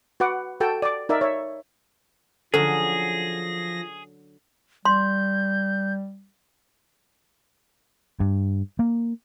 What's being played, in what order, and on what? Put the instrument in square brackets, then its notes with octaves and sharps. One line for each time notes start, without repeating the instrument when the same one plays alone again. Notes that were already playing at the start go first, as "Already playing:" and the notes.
[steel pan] F#4 B4 F#5 D6
F#4 A4 G5 A5
D5 D6
D#4 A#4 D5 E5
C#5 E5
[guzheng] D3 F#3 C#4 [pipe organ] F3 A#6 [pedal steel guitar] G#4 [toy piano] A4
[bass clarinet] G3 [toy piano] C6 [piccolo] G6
[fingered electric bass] G2
A#3